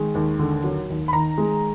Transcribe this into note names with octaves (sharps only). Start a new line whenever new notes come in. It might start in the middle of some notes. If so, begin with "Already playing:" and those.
Already playing: D#3 G#3
D#2
D3
F#3
D#2
B5
D#3 A#5
G#3